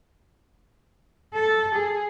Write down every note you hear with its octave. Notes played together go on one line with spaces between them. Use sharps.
A4
G#4